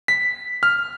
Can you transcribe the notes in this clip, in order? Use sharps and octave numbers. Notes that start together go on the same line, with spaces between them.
B6
F6